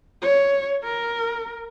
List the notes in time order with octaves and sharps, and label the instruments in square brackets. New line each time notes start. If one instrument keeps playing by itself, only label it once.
[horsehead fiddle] C#5
A#4